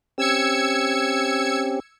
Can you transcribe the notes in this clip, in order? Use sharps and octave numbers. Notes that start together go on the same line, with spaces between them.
C4 C#4 G4 E6 G#6 C#7